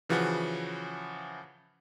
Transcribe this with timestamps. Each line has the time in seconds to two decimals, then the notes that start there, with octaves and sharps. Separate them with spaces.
0.09 C#3 E3 F3 F#4 B4 F#5